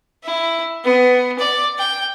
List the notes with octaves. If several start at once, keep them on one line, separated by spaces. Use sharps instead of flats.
E4
B3
D5
G5